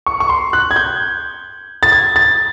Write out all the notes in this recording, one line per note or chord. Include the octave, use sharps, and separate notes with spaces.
C#6
C#6
C6
F#6
G#6
G6
A6
G#6
A6